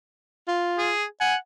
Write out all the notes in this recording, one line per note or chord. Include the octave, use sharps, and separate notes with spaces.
F4
G#4
F#5 G#5